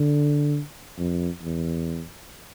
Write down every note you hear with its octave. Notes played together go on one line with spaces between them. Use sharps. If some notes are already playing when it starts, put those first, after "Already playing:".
Already playing: D3
F2
E2